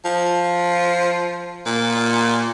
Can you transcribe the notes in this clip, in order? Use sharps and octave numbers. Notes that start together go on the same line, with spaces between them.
F3
A#2